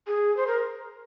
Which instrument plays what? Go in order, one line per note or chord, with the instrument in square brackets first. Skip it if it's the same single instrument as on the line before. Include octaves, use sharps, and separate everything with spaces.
[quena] G#4
C5
A#4